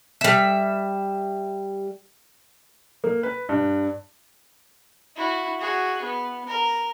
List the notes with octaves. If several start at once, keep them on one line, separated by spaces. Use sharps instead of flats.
G3 E5
A#3
B4
G2
E4 F#4
F#4 G#4
B3
A#4